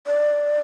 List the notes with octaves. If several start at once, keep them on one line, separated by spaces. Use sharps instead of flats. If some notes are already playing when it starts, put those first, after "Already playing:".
D5